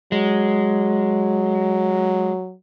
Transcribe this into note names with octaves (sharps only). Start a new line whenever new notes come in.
F#3 G#3